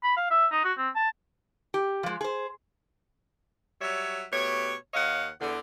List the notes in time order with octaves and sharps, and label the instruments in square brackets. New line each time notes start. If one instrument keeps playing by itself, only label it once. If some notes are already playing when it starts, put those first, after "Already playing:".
[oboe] B5
F5
E5
D#4
F#4
C4
A5
[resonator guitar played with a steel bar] G4
F3 G#3
G#4 C5
[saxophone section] F#3 G3 C#5 E5
B2 A3 G4 C#5
D#2 C#5 D#5 F5 F#5
E2 D3